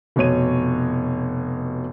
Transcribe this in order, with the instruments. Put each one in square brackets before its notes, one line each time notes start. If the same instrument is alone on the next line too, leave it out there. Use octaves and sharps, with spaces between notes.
[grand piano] F1 B2 C#5 D#7